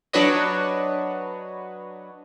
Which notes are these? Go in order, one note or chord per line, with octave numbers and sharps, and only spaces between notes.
F#3 D4 F#4 B4 C#5 D#5